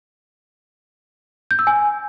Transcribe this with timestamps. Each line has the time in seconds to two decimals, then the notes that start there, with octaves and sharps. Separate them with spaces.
1.51 G6
1.59 E6
1.67 G#5